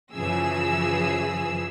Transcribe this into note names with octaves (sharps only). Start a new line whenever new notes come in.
F#2 C#3 E3 F3 G#4 E6